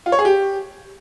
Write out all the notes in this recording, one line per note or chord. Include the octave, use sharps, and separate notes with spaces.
F4
C#5
G#4
G4